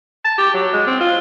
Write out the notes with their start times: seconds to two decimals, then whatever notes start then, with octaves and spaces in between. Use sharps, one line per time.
0.25 A5
0.38 G4
0.54 F#3
0.74 G#3
0.87 C4
1.00 F4